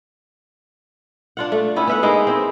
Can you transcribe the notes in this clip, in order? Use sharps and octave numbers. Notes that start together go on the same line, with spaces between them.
D4 F4 F#5
A3
B3 C#4 E4
B3 E5 F#5
G#3 A#3 D#4 E4
C4 E4